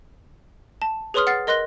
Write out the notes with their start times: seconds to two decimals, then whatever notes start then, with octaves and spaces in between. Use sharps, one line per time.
0.82 A5
1.14 G#4 B4 C#5 C6 D#6 F6
1.27 F#5 F6 A6 C7
1.47 A#4 D#5 C6 F#6 A#6 G7